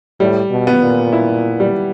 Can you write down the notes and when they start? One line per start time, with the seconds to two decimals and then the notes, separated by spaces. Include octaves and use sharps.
0.20 A2 G3
0.50 B2
0.67 B3
0.82 A#2
1.13 E4
1.60 G3